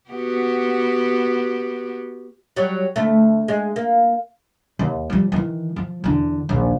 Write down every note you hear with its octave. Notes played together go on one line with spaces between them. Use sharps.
B3 F#4 G4
F#3 G3
D2 A3
G#3
A#3
D#2
F3 G3
D#3 E3
F3
E2 D3
A#1 D#2